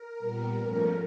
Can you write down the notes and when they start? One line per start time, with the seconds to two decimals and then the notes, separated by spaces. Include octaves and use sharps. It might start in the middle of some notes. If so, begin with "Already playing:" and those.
Already playing: A#4
0.18 A#2 G3 B3
0.56 G#2 F3 A3 C#4